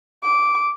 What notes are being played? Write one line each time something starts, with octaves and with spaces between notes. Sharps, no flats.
D6